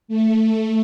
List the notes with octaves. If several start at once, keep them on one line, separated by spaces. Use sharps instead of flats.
A3